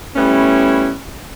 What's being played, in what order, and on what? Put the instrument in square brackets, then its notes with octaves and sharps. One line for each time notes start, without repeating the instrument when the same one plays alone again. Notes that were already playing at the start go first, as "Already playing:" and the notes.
[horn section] G3 A3 B3 C#4 E4